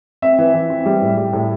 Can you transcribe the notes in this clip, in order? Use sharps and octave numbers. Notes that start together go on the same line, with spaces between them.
C4 E5
E3
E3
C4
G3
A2
G3
A2